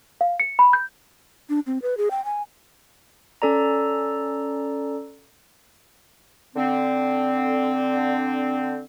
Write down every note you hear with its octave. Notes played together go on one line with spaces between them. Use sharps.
F5
C#7
B5
G6
D4
C4
B4
G#4
G5
G#5
C#4 A4 D5 A#5
D3 C4